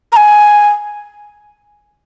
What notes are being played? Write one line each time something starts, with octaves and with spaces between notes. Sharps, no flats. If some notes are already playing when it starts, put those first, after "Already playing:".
A#5
G#5